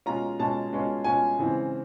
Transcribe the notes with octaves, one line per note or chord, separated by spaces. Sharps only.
B2 G#3 C#4 F4 A#5
B2 G#3 C#4 F4 A5
B2 G#3 C#4 F4
B2 G#3 C#4 F4 G#5
C#3 E3 G#3 C4